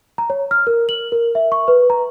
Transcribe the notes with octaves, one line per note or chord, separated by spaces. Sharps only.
A#5
C#5
F6
A#4
F#7
A#4
E5
C#6
B4
A#5